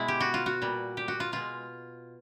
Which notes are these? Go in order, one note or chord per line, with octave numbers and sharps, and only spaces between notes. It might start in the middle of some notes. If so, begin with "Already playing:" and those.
Already playing: B2 G#3 E4
G4
F#4
F4
F#4
A#2 G3
G4
F#4
F4
B2 G#3 F4